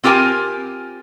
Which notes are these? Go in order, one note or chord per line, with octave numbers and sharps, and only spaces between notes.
C4 F4 G4 A#4 G#5